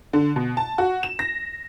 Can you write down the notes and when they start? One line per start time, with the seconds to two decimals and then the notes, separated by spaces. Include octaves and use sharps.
0.13 D3
0.36 B2
0.57 A5
0.78 F#4
1.03 E7
1.19 A#6